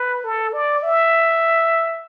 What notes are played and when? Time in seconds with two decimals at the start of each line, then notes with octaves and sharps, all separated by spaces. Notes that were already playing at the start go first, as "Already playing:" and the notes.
Already playing: B4
0.24 A4
0.53 D5
0.83 E5